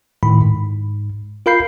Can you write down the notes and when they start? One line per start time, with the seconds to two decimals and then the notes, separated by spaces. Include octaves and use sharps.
0.23 A2 D#3 B5
0.42 G#2
1.46 F4 A#4 F5 B5 G6 C7